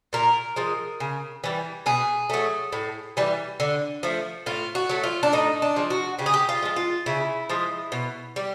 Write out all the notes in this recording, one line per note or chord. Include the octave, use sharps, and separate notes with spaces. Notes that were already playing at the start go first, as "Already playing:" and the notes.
A#2 A#4
F3 G#3
C#3
E3 G3
B2 G#4
F#3 A3
A2
E3 G3
D3
F3 A3
A2 F4
F#4
F#3 A3
F4
D4
A2 D#4
D4
F3 G#3
F#4
C#3 G4
G#4
G4
F4
F3 G#3
F4
C#3 E4
F3 G#3
B2
G3